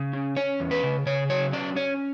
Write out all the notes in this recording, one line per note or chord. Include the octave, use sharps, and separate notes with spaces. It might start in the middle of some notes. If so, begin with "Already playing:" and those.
Already playing: C#3
C#4
C#4 C#5
E2
B4
C#3
C#3 C#5
F#3 C#5
C#4 D5
C#4 C#5